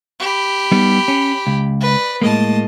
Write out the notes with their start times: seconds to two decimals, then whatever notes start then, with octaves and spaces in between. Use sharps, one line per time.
0.20 G4 B5
0.72 G3 B3 D#4
1.08 C#4
1.47 C#2
1.80 B4 D5
2.22 A2 G#3 A#3 D#5 A5